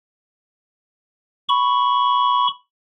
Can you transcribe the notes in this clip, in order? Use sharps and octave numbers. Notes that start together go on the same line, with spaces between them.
B5 C#6